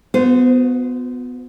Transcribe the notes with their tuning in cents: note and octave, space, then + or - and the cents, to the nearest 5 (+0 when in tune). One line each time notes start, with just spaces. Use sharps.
B3 +15 F#4 -40 C5 -20